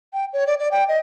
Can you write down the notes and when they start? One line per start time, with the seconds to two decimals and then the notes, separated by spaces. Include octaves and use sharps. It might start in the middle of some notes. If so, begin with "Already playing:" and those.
0.13 G5
0.33 C#5
0.47 D5
0.59 D5
0.71 G5
0.88 D#5